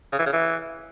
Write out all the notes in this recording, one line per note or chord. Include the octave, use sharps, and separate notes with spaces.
C#3
E3
C#3
E3